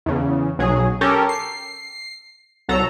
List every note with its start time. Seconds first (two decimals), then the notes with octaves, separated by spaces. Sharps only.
0.06 E2 C#3
0.59 B1 F#3 G#4
1.01 C#4 G4 A4 A#4
1.29 C7
2.69 C2 F#3 A4 A#5